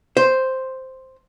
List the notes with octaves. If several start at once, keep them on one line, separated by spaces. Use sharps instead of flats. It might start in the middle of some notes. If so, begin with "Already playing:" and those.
C5